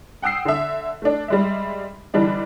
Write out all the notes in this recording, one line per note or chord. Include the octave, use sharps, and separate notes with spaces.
F#5 G5 D#6 E6 C7
D3 E5
A3 D4
G3 G#3 E5
D3 E3 G3 D4 D#4